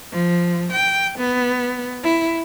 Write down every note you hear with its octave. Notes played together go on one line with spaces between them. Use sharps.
F3
G5
B3
E4